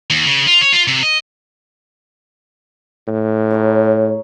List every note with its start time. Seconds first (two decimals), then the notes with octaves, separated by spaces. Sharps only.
0.10 D#2
0.25 C#3
0.47 F4
0.61 C#5
0.73 F4
0.88 C3
1.03 D#5
3.08 A2
3.51 G#4 A#4 C#5